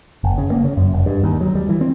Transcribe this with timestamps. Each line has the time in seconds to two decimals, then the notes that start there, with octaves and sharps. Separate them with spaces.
0.24 F#1
0.38 C#3
0.52 A#3
0.64 C#3
0.77 F#2
0.93 F1
1.06 G2
1.23 D#2
1.41 F#3
1.55 G3
1.69 E3
1.81 C4